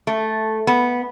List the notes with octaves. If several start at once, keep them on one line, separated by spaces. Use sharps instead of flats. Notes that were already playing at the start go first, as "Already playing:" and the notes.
A3
B3